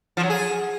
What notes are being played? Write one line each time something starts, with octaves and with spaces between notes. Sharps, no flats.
F3
F#3
G#4